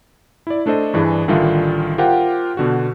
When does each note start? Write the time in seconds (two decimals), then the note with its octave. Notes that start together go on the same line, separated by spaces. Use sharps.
0.47 E4 D5
0.66 A3 D4 A4 C5 D#5
0.94 G2 E3 D4 G#4
1.28 A1 D3 D#3 G3 F4 E5
1.98 F4 G4 A#4 C5 F#5 G5
2.57 B2 D3 F#4